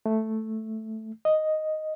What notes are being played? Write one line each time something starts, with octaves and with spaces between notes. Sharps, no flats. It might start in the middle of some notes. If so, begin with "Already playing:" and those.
A3
D#5